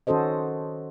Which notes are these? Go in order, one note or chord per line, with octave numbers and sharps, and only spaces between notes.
D#3 C#4 F#4 A4 C5 D#5